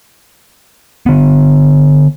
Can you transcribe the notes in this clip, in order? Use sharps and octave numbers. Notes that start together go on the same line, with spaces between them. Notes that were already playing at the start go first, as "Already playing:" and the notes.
D3 B3